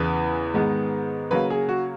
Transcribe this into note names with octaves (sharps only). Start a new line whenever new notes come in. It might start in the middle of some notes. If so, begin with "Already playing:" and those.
Already playing: E2 C#3 E3 B3 B4
G#2 D#3 G#3 B3
C#3 F#3 A#3 B4
G#4
F#4